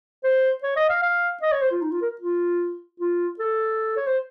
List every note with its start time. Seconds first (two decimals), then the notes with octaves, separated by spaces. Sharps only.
0.24 C5
0.63 C#5
0.76 D#5
0.89 F5
1.03 F5
1.42 D#5
1.52 C#5
1.62 C5
1.72 F4
1.82 D#4
1.91 F4
2.02 A#4
2.21 F4
3.00 F4
3.39 A4
3.97 C#5
4.07 C5